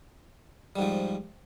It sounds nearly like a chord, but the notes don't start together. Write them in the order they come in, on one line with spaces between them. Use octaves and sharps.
G3 G#2 F3